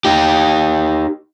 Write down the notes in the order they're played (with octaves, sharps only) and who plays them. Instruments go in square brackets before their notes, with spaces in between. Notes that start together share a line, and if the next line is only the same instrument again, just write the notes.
[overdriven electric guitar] D#4 G4